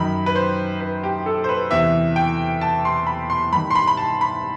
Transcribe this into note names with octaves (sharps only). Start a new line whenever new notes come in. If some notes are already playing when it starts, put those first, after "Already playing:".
Already playing: F#2 D#3 B5
B4
C5
B4
G4
A4
C5
B4
E2 C3 E3 E5
G5
A5
C6
B5
C6
G2 D#3 B5
C6
B5
B5
A5
B5